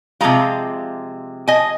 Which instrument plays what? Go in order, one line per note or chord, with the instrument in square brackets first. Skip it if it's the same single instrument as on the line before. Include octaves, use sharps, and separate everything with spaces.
[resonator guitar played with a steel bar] C3 F3 G#3 F4 F5 A#5
D#5 G#5